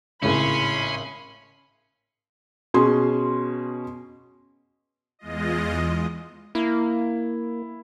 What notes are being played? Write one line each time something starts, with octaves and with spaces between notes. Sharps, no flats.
G#1 A2 C#3 C#4 B5 C6
B2 C#4 G#4 C6
E2 G#3 F4 D#5
A#3 E4